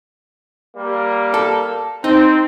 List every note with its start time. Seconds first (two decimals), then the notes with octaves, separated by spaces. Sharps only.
0.77 G3 A#3
1.34 A4
2.04 C4 D#4